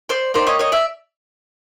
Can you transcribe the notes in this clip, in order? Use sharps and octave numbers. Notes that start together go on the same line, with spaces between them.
C5 D5
A#3 D#4 G4 C5 D5
C#5 D#5
C#5 D#5
D5 E5